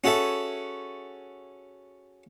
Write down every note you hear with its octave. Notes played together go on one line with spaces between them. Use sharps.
C#4 F#4 G#4 A4 E5